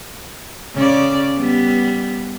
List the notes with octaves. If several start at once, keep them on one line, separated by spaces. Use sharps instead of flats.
C#3 D5
G3 B3